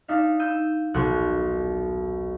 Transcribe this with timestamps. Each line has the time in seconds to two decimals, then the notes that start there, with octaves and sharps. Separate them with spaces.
0.08 D4 D#4 E5 F5
0.39 E6 G6 D#7
0.94 D#1 B1 F#6